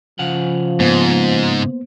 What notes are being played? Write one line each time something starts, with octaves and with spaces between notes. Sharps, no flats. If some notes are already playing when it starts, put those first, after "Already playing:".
C#3 F3 F5 F#5
G#2 A#3 B3 C5